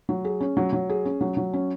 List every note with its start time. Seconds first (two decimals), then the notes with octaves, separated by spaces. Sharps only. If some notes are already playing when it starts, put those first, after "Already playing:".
0.09 F#3
0.25 G#4
0.41 C#4
0.57 F#3
0.73 F#3
0.89 G#4
1.05 C#4
1.21 F#3
1.37 F#3
1.53 C#4